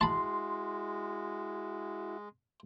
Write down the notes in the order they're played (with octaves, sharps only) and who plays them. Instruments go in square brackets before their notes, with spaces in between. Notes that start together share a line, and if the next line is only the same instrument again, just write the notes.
[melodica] G#3 [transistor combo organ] E4 F#4 [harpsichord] A5 B5 [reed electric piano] C6